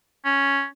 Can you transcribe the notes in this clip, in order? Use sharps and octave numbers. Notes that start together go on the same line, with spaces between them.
C#4